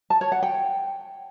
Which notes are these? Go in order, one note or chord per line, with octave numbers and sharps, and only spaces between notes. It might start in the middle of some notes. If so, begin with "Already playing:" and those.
A5
C#5
F#5
G5